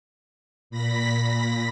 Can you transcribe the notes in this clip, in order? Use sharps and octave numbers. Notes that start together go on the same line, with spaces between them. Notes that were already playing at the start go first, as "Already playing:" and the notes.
A#2 B5 A#6 B6